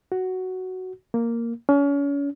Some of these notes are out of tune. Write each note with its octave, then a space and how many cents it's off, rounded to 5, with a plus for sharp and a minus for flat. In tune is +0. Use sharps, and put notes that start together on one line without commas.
F#4 +5
A#3 -5
C#4 +35